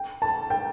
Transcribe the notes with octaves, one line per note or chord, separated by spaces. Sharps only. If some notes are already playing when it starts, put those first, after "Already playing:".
Already playing: G5
A5
G5